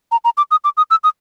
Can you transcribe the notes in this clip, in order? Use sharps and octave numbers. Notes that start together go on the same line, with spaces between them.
A#5
A#5
D6
D#6
D6
D#6
E6
D#6